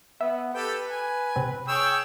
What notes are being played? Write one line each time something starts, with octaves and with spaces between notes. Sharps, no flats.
B3 E5
G4 A4 B4 G5
G#5
C3 C4
G#4 C#5 G5 E6